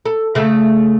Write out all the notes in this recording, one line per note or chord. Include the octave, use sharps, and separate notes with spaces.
A4
C#3 A3